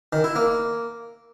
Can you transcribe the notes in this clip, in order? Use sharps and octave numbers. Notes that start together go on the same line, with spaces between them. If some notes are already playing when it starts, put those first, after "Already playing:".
D#3
E4
A#3